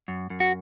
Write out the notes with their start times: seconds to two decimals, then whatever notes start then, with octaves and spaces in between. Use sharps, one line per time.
0.08 F#2
0.30 F#2
0.40 F#4